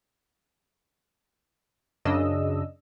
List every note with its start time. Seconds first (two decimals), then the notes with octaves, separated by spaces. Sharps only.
2.05 F#2 C#3 D4 D#5 E6